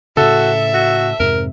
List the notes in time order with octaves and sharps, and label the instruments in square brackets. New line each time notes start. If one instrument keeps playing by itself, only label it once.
[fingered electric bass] A2 C#3 [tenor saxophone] F#4 [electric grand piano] A4 [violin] E5
[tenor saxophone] F#4
[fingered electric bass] F2 G#2 C3 [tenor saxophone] A#4